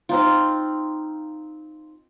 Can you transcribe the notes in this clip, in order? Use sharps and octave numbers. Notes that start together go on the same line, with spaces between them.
C4 D#4 F4